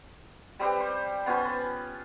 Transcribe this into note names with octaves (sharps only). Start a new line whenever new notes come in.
G3 C4 G4 B4
C5
B3 C#4 F4 C5
B4